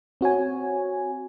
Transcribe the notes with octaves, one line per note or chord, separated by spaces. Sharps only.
C4 F#4 C#5 G#5